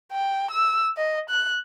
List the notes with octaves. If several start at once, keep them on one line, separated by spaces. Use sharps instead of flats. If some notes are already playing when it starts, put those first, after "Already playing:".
G5
E6
D#5
F#6